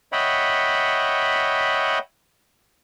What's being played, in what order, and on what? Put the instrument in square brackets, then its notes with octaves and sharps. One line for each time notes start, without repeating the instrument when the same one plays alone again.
[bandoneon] C#5 D#5 E5 F#5 G5 B5